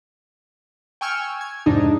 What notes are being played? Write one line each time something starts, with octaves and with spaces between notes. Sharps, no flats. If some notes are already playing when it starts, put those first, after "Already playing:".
G5 G#5 C#6 E6 F6 G#6
G#6
F2 G#2 C3 D4 D#4